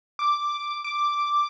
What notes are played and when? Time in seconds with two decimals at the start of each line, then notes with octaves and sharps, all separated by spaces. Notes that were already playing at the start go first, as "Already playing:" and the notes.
0.19 D6
0.84 D6